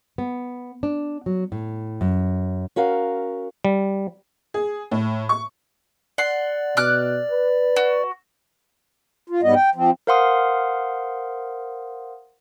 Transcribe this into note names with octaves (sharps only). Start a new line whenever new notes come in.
B3
D4
F#3
A2
F#2
C#4 F#4 A#4 F5
G3
G#4
A2
C#6
D5 F#5 C6
B2 D6 F6 F#6
B4
F#4
F4
G#2 G3 B3 D#5
G5
F3 C4
A#4 C5 F5 F#5 C6 D#6